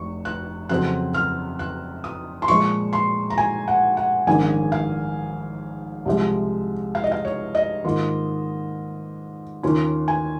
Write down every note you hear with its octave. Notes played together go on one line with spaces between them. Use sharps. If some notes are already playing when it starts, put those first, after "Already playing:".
Already playing: F1 C#6
F#6
F2 C#3 F#3 C4 F#6
F6
F#6
D#6
C6
A#2 F3 G#3 C#6
C6
A#5
G#5
F#5
F#5
A#1 G#2 D#3 A#3 C#4 G#5
F5
C2 C3 F3 G#3
F5
D#5
F5
C#5
D#5
G#2 D#3 A#3 F4
D#2 D#3 A#3 C#4 F4
G#5